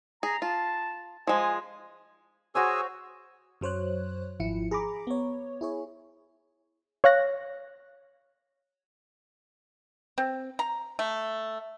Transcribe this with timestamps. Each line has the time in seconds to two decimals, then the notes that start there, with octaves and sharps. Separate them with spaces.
0.23 G#4 A#5
0.42 F4 A5
1.27 F3 G#3 G#5
2.55 F#4 G#4 C5 C#5 G#5 E6
3.61 F#2 F#3 C5 C#5 F#6
4.40 G#1 F3 E4 C#7
4.71 G#4 A#5 B5 D6
5.07 B3 C#5
5.61 E4 G#4 C#5
7.04 C#5 F5 F#6 A#6
10.18 C4
10.59 A#5
10.99 A3